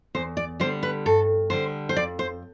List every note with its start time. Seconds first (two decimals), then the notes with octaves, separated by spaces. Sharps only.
0.15 E2 C5
0.37 D5
0.60 D3 G3 C5
0.83 B4
1.06 G2 A4
1.50 D3 G3 C5
1.89 C5
1.96 F2 D5
2.19 C5